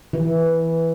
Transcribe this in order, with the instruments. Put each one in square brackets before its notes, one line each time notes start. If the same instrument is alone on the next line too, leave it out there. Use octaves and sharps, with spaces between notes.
[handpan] E3